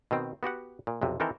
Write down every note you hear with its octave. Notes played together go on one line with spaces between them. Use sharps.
B2 D#3 C4
B3 F#4 G4 F#5
A#2
B1 F2 C3
D#3 E3 C4 A4 A#4 C5